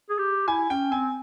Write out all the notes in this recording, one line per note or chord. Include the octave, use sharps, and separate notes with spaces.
G#4
G4
E4 G#5
C#4 G5
C4 G#5